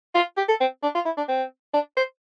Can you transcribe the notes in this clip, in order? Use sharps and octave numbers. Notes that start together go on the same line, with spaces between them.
F4
G4
A4
C4
D4
F4
E4
D4
C4
D4
C5